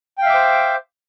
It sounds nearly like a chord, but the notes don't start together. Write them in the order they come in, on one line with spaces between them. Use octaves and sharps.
G5 F5 E5 D6 C5